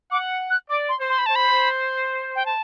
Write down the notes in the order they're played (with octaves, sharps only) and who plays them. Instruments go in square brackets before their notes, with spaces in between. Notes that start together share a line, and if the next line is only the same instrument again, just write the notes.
[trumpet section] F#5 [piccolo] D6
[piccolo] F#6
[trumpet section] D5 [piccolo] D6
[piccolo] C6
[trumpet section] C5
[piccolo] C6
B5
[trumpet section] C5 [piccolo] A5
[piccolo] B5
G5
A5